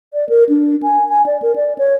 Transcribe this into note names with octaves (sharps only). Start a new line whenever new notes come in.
D5
A#4
D4
G#5
G#5
D5
A#4
D5
C#5